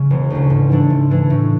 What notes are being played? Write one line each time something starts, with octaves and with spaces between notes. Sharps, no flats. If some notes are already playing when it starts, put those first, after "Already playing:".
Already playing: C#3
E1
D2 C#3
G#2
E3 A3 D4
G#2
E3 A3 D4
A2